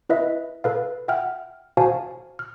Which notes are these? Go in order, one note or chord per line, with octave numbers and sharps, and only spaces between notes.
E4 B4 D#5 E5
A4 B4 F5
E5 F#5 G5 F6
F#4 C5 F5 G#5 A5
F6